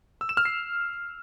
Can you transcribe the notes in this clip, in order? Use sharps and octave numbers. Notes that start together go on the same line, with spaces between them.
E6
E7
F6
C7